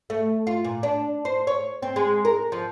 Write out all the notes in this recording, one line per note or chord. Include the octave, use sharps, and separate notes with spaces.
A3
F4
A#2
D4
C5
C#5
C4
G#3
A#4
F3